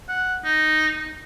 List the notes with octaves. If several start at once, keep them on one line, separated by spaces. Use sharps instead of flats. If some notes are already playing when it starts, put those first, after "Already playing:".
F#5
D#4